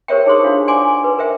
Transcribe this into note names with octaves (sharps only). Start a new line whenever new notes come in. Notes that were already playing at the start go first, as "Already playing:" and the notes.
G4 A#4 C5 C#5 E5 G5
D#4 G#4 C5 C6 D#6
D4 F4 F5
D5 F#5 G#5 C6 D6
B4
A#4 C5 E5 G5